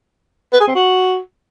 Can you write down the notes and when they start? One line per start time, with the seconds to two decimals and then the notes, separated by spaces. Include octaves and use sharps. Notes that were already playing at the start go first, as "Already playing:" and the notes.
0.53 B4
0.60 G#4
0.67 C4
0.75 F#4